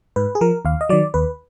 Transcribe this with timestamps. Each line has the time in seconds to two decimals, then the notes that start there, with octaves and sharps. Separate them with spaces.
0.16 G#2 B4
0.35 G#4
0.41 F3 A#4
0.65 D#2 F5
0.81 D#5
0.89 D#3 F#3 D5
1.14 D#2 B4